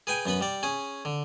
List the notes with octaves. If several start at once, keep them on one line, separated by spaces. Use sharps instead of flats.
G#4 B4 G5 G#5
F#2 B3 B4 B5
G3 D5
C#4 G#4
D3